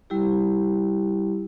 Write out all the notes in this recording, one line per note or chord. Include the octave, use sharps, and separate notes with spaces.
G3 E4 G4